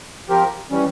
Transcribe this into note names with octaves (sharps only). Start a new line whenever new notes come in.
F3 C4 G4 A#4
E3 G3 C#4